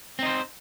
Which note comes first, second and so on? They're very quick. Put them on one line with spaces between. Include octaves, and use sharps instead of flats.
C4 D#4 C5